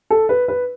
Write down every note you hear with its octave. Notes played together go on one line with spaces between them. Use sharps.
A4
B4
B4